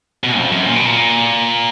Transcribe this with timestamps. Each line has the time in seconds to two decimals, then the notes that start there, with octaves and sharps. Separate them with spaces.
0.24 B2
0.38 F2
0.52 F#2
0.66 A#2
0.76 B2
0.85 A#2